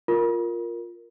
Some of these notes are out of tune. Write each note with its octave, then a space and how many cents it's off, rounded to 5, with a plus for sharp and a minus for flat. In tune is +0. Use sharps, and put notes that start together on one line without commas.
F4 +0 A#4 +0